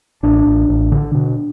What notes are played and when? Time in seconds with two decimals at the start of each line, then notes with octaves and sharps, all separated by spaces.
0.23 A1 D4
0.46 A1
0.69 A1
0.92 D3
1.15 B2